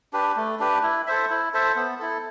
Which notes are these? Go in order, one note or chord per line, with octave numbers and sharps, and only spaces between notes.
D4 G4 B4
A3
D4 G4 B4
E4
A4 C5 E5
E4
A4 C5 E5
B3
E4 A4